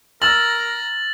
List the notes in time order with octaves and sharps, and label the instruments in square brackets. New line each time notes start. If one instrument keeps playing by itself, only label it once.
[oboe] A#4 [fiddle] A#5 [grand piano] E6 F6 [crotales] A6 A#6 F#7